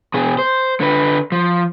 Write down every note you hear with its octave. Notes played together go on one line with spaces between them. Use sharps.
B2 G#4
C5
D3 B4
F3